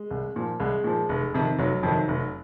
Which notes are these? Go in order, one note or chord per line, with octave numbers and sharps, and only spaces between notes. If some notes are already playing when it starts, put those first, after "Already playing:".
Already playing: G#3
C2
A#2 F3
C2 G#3
A#2 F3
F1
F2 C3 D#3
F1 F#3
F2 C3 D#3
F1